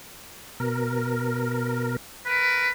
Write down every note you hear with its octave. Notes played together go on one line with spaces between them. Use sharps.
B2 A#4
A#4 B4